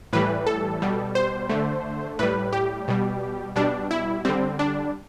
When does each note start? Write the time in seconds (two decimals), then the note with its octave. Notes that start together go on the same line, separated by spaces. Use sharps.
0.13 A2 E3 G3 B4
0.47 A4
0.82 B2 G3
1.15 C5
1.49 D3 A3
2.19 A2 G3 B4
2.53 G4
2.88 B2 G3
3.56 B2 G3 D4
3.91 E4
4.25 D3 G3 C4
4.59 D4